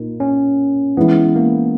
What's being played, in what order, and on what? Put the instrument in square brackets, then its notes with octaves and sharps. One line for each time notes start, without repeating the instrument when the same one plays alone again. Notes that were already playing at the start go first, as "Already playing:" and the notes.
Already playing: [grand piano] A#2 A#3 D#4
[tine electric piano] C#4
[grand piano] E3 G#3 C#4 E4 [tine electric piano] B3
[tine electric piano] A#3